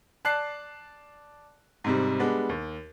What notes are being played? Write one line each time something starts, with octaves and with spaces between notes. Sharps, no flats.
D5 A5 F#6 C7
G#2 C3 G3
G3 G#3 B3 D4
D#2